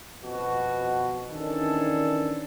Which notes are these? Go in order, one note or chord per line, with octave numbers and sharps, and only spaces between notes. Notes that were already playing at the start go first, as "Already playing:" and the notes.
F2 B2 F#4
D#3 E3 C#4 D4 G#4 A4